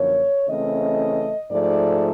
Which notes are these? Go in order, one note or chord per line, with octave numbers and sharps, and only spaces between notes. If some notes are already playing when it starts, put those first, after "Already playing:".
Already playing: F#2 D3 F3 A#3 C#5
C#3 E3 A3 C4 D#5
G#2 F3 A3 D5